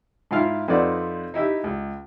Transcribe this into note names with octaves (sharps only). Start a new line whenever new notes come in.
G#2 E4 F4 F5 F6
F2 C4 D#4 B4 D5 F#5
D#4 E4 G4 E5
C#2